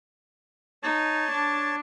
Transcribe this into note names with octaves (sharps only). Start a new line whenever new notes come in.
D#4 C#5 A5
D4